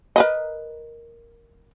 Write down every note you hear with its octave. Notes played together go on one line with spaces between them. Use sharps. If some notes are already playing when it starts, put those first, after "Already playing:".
A#4 B4 D#5